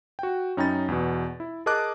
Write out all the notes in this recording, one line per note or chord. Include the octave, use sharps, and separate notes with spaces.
F#4 G5
F#2 C#4 D#4 G5 B5 A6
E2 B2
E4
G#4 A#4 D#5 A5 D6 F#6